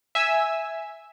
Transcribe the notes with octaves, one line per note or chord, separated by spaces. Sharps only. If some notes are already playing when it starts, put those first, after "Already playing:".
E5 G#5 E6